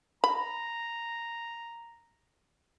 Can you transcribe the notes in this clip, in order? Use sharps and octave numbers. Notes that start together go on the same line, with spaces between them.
A#5 B5